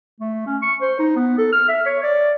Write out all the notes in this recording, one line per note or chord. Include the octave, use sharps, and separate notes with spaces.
A3
C#4
C#6
C5
D#4
B3
A4
F6
E5
C#5
D5